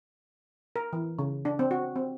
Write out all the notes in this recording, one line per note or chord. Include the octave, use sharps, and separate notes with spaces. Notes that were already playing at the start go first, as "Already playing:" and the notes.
A#4
E3
C#3
D4
C4
F#4
C4